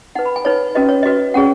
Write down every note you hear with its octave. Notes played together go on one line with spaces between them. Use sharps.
D#4 B4 F#5
B5
G#5
D#4 B4 C#5
C#4 F#4 B4 D#5
C#5
F#4 B4 D#5
C#4 G#4 C#5 F#5